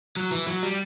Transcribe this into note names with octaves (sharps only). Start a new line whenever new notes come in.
F#3
E3
F#3
G3